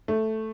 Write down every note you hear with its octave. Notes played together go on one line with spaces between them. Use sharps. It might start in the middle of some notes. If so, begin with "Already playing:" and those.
A3